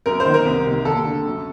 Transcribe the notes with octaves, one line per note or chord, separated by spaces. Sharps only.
F#2 A#4
C5
D#3
A#4
C2
C3 D#3
D#2 A4
D3
F#2